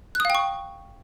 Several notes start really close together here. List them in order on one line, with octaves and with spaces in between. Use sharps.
F#6 D#6 F5 G5 C#6